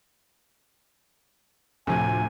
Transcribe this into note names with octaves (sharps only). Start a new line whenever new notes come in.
D2 A2 C3 F3 G#5